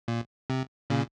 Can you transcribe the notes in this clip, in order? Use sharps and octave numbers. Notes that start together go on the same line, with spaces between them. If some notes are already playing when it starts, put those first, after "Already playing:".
A#2
C3
A#2 C#3